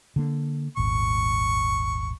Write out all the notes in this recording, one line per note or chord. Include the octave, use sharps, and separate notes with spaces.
D3 A#3
D#1 G#1 C#6